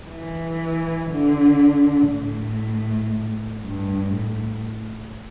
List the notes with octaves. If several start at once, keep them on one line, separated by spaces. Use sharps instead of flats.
E3
D3
A2
G2
A2